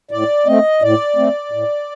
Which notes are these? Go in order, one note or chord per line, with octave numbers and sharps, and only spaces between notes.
A2 D5
A3 C4 D#5
A2 D5
A3 C4
A2